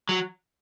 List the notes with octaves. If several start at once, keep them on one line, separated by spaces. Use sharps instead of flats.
F#3